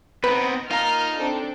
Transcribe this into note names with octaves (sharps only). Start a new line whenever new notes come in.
B3 C4 D#4 B4
A#3 D#4 F4 A#5 F6
C4 D4 A4